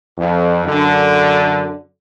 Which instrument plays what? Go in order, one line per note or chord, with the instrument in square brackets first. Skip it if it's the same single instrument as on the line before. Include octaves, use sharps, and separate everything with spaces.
[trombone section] F2
F#2 D3